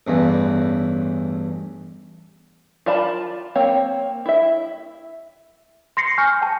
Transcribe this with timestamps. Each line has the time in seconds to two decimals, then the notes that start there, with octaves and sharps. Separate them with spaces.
0.07 A1 E2 G2
2.86 F4 A#4 D5 A5 B5
3.55 A#3 C4 C#5
4.26 E4 E5
5.97 C6 A#6 C7 C#7
6.18 G#5 C#6 F6 G6
6.41 G5 A5